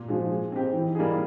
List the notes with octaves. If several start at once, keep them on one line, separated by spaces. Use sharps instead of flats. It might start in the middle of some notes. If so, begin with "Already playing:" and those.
Already playing: A#2
F3 G#3
G#3
C4 D#4 G4
E3
G3 A#3 D#4 G#4